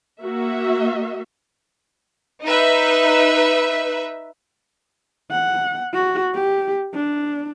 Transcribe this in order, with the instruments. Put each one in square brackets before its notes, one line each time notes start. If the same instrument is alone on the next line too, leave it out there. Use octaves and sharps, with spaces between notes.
[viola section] A#3 F#4 E5
[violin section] D#4 B4 E5
[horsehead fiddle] F#5
F#4
G4
D4